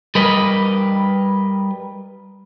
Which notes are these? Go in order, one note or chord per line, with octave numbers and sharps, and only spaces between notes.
G3 A#4 B4 D#5